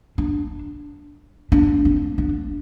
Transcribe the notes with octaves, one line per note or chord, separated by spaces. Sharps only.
D4
D4
C4
D4